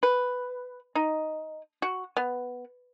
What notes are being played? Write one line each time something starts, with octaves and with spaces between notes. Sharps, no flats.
B4
D#4
F#4
B3